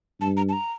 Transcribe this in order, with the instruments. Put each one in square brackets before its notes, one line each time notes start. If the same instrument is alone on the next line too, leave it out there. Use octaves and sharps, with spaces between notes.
[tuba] G2 [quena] A5
[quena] A#5
A5
A#5